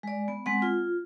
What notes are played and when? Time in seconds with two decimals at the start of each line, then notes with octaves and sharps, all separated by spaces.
0.03 G#3 D5
0.28 B3
0.46 G#3 C4 F#5
0.62 F4